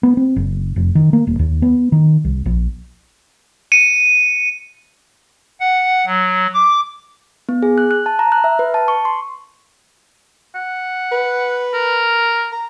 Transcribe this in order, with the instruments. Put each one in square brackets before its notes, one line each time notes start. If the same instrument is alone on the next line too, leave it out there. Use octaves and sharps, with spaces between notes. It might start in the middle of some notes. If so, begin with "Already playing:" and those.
[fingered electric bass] B3
C4
F#1
F1
D#3
A#3
D#1
D#2
B3
D#3
C2
A#1
[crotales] C#7 D#7
[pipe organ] F#5
F#3
D6
[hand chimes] B3
G#4
F#6
F#6
A5
A#5
F#6
E5
B4
A5
C#6
C6
[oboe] F#5
[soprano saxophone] B4
[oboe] A#4
[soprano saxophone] A#5